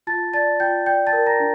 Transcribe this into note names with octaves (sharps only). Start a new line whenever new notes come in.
F4 A5 A6
D5 A5 A6
F4 G5 G6
D5 G5 G6
A5 A6
A#4
A#5 A#6
D4